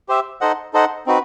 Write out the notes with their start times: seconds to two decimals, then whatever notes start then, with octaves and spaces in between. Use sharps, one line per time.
0.09 G4 C5 E5
0.41 D#4 A4 C5 D#5 F#5
0.73 D#4 A4 C5 D#5 F#5
1.07 C4 D#4 F#4 B4